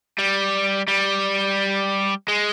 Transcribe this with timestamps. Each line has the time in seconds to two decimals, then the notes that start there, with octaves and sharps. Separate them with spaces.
0.19 G3
0.88 G3
2.28 G#3